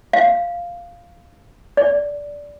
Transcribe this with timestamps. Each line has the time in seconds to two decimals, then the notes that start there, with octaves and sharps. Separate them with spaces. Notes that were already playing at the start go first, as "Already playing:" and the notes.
0.13 F5
1.77 D5